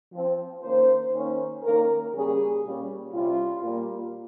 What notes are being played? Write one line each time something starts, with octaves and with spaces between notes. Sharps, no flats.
F3 C4
D#3 A#3 C#4 C5
D#3 A#3 C#4
D#3 A#3 C#4 A#4
C#3 G3 A#3 C#4 G#4
A#2 G3 A#3 C#4
C3 G3 C#4 F4
A#2 G3 A#3